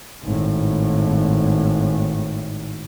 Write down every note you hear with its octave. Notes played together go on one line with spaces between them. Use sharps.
G#1 A2